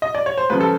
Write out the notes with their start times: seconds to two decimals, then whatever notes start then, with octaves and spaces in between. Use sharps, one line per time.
0.02 D#5
0.15 D5
0.26 C#5
0.37 C5
0.50 C#2 C#3 F3 B4
0.60 A4